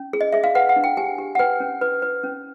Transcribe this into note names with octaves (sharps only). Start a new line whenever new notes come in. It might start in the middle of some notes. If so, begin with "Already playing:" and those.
Already playing: C#4
G#4
D#5
G#4 E5
F5
B4 F#5
F#5
D4
G5
G4 G#5
G4
F#5
B4 G5
C#4
B4
B4
C#4